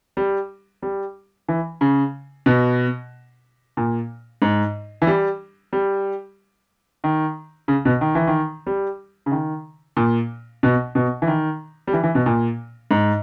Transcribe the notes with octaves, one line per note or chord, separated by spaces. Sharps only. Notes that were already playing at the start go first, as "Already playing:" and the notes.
G3
G3
E3
C#3
B2
A#2
G#2
E3
G3
G3
D#3
C#3
B2
D#3
E3
D#3
G3
C#3
D#3
A#2
B2
B2
E3
D#3
G3
E3
E3
B2
A#2
G#2